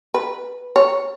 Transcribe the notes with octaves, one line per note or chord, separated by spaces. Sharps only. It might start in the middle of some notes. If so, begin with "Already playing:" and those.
B4
C#5